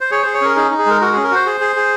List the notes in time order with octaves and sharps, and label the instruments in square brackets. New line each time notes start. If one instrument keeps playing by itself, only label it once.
[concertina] C5
G#4 C#5
G#4 C5
C#5
C#4 A#4
D#4 G#4
D#4
G#4
G#3 A#4
F#4 A#4
C#4 G#4
A#4
F#4 C5
G#4
G#4
G#4